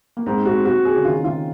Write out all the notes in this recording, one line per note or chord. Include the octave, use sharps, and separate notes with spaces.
A#3
G#2 C4
C4 F#4
C4 F#4
C4 G#4
C#3
D#3 F4
D#3 F4